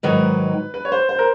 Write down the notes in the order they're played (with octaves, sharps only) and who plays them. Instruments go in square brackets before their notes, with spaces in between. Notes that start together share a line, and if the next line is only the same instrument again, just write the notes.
[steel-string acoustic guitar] G#2 D#3 F#3 [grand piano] B4
[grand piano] B4
C#5
C5
C5
A#4